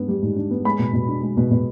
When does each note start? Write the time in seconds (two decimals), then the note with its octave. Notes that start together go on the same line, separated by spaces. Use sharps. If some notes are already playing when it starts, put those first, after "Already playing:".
Already playing: G#2 B3 D4
0.08 G3
0.22 G#2
0.36 D4
0.51 B3
0.65 G#3 B5
0.79 B2
0.93 B2
1.08 D4
1.23 G#3
1.37 B2
1.51 B2